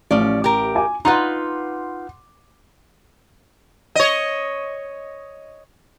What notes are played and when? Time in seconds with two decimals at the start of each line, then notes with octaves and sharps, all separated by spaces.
0.11 A1 F3 C#4 D5
0.44 G4 A#4
0.75 G#5 D6
1.05 D#4 F4 B4 F#5 C6
3.95 C#5 D#5